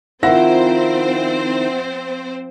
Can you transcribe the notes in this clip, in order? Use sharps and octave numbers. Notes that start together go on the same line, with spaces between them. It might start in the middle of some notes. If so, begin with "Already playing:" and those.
D#3 F3 C4 E4 C5 E5 F#5 A#6